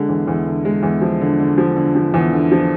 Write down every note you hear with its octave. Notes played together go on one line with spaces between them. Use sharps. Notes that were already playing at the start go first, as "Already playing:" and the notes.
Already playing: D3 G#3
E2
E2
D3
G#3
E2
F3
D3
D3
F3
D3
F3
E2
D3
F3